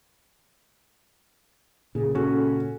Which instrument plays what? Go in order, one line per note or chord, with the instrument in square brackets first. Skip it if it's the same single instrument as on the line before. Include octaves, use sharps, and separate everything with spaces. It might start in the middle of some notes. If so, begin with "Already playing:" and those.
[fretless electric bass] A#2 C#3 [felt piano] G#4
[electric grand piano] C#4 F#4 [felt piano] A4